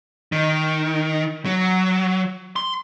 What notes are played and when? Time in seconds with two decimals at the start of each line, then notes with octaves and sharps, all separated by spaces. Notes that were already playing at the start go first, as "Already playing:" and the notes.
0.32 D#3
1.45 F#3
2.56 C6